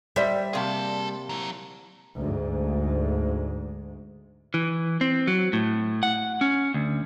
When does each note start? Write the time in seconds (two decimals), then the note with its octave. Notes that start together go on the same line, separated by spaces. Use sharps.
0.16 G3 C5 D5 E5 B5
0.53 C3 A#3 G#4 A5
1.29 F#3 E4
2.16 D2 G#2
4.54 E3
5.01 C4
5.27 F#3
5.53 A2
6.03 F#5
6.41 C#4
6.74 D2